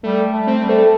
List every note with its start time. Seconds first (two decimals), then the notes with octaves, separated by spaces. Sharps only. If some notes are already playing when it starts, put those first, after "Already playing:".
0.03 G3 A3
0.33 A3
0.47 C4
0.62 G3
0.69 A3